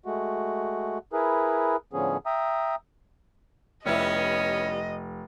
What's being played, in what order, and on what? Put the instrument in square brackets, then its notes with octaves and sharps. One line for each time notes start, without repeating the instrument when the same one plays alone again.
[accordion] G#3 A3 F#4
E4 G#4 A#4 B4
A2 D3 F3 B3 C#4 G#4
E5 G5 A#5 D#6
[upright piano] F1 [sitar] G3 B3 E4 [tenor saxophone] C#4 [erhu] D#5